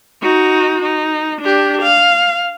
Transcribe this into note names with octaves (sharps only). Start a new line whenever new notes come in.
D#4 F#4
D#4
D4 G4
F5